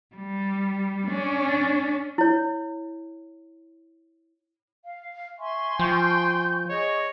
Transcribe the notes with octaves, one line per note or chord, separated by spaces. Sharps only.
G3
C#4 D4
E4 C#5
F5
E5 G#5 C6 C#6
F3 G5 G6
G#4 C#5 D#5